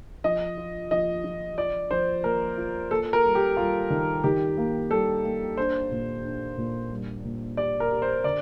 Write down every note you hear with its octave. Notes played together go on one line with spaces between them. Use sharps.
F3 D#5
F4
F3 D#5
F3
F4 D5
F3 C5
A#3 A#4
F4
A#3 A4
A#4
G3
G4
G3 F4
D#3
D#3 G4
A#3
G3 A4
A#3
D4 C5
A#2
D4
A#2
G3
A#2
G4 D5
A#4
G4
C5
D3 D5